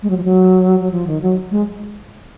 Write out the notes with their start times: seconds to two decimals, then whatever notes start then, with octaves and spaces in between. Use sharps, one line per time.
0.03 G#3
0.10 F#3
0.17 F3
0.24 F#3
0.80 F#3
0.91 F3
1.07 D#3
1.22 F#3
1.51 G#3